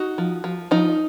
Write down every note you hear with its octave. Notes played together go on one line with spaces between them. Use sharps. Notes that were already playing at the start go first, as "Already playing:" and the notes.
Already playing: D#4 F#4
F3
F3
F3 D#4